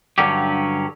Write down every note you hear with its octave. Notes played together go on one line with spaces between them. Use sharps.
G2 D3 F#3 C#4 G4